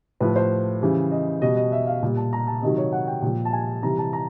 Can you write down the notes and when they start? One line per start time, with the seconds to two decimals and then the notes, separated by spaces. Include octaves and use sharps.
0.20 A2 F3 B4
0.36 C5
0.81 C#3 E3 G3
1.11 D#5
1.42 B2 G3 D#5
1.57 D#5
1.72 E5
1.87 F5
2.03 A#2 G3
2.17 A5
2.33 A#5
2.47 A5
2.62 C3 D#3 F#3 D#5
2.78 C#5
2.93 F#5
3.08 G5
3.22 A#2 F3
3.45 A5
3.53 G#5
3.83 C3 E3 G3 A#5
3.98 A5
4.13 A#5